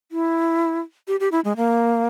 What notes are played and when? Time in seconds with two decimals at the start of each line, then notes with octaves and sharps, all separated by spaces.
0.12 E4
1.08 G4
1.20 G4
1.32 E4
1.45 G#3
1.57 A#3